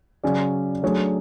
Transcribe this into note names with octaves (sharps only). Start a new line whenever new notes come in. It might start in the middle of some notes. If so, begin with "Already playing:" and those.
C#3 F#3 C#4 G#4 D5
F#3 A3 D4 G#4 C#5